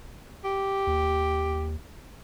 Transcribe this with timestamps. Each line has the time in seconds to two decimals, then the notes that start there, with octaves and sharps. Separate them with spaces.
0.44 G4
0.87 D#2